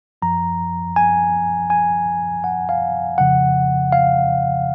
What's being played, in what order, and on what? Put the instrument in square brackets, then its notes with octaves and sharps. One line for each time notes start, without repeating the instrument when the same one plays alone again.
[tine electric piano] F#2 F3 A#5
G#5
G#5
F#5
F5
F2 C#3 F3 F#5
F5